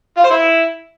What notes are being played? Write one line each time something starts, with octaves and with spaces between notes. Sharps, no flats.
F4
C5
E4